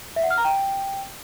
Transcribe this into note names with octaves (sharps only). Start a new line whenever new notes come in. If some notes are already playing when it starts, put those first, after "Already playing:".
E5
F#5
F6
A#5
G5